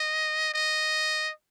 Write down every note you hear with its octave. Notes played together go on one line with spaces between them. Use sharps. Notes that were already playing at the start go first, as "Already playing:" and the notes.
Already playing: D#5
D#5